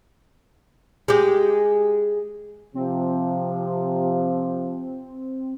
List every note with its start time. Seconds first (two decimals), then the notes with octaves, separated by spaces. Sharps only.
1.08 G#3 G4
2.75 C3 F3 C4